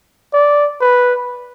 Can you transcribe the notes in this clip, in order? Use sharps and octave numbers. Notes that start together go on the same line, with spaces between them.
D5
B4